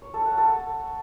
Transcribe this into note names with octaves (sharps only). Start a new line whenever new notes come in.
C#5
A4
F#5
A4